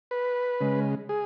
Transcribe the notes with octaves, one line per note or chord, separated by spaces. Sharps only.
B4
C#3 G#3
G#4